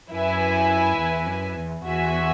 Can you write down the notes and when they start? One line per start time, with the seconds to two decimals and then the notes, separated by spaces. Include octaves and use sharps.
0.11 F#2 E4 B4 E5 G#5
0.98 E2
1.26 F#2
1.55 E2
1.84 E2 F#4 E5 G#5